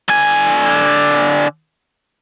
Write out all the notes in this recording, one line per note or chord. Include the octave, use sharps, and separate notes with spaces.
D3 G#5